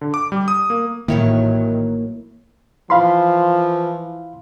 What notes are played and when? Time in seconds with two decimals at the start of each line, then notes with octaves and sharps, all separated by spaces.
0.01 D3
0.14 D6
0.32 G3
0.48 D#6
0.70 A#3
1.08 A1 D#3 F#3 A#3 E4 C#5 C#6
2.90 E3 F3 F5 B5 C6